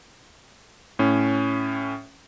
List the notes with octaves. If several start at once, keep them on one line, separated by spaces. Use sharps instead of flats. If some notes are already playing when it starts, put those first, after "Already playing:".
A2 C#4